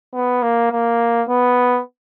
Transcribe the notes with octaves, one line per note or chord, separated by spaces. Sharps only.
B3
A#3
A#3
B3